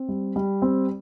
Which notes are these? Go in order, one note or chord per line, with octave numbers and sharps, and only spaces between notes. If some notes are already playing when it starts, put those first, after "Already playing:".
Already playing: C4
G3
G3
C4